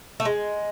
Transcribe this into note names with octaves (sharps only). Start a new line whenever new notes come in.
A3
G#3